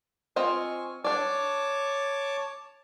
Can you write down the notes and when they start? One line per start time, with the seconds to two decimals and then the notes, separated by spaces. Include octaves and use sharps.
0.36 C4 F4 D#5 G#5 C#6
1.04 D4 C#5 D5 A5 D6